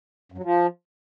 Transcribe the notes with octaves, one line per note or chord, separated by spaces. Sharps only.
F#2
F#3
F3